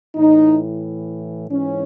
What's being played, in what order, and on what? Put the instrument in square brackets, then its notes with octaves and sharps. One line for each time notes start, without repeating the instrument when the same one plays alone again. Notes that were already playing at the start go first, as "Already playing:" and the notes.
[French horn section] A2 E3 D#4
G#2 E3 C#4